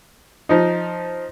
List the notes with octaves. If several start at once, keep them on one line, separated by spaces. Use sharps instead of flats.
F3 D#4